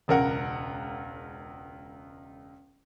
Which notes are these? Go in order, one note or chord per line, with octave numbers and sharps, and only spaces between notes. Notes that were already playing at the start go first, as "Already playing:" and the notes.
E1 C#2 A#4 F#5